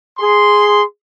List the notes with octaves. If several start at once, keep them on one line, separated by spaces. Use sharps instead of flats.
G#4 C6